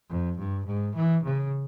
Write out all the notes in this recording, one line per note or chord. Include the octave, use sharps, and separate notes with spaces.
F2
G2
G#2
E3
C#3